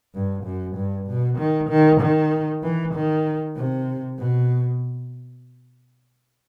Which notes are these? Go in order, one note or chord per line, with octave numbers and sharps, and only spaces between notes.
G2
F#2
G2
B2
D#3
D#3
D#3
E3
D#3
C3
B2